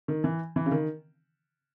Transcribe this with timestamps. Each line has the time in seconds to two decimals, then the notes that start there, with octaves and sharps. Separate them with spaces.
0.08 D#3
0.24 E3
0.56 E3
0.66 C#3
0.71 D#3